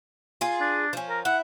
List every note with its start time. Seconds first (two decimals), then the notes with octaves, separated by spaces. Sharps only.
0.41 F4 G#4
0.60 D4
0.93 F3 C#4
1.09 A#4
1.25 E4 F#5